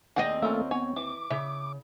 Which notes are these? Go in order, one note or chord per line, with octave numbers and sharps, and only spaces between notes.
D#2 C4 G#4 D#5 F#5 G5
A3 A#3 C#4 F4 A4 A#4
B3 C#5 G#5
E3 D6
C#3 E5